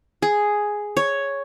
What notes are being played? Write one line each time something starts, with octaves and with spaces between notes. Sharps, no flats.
G#4
C#5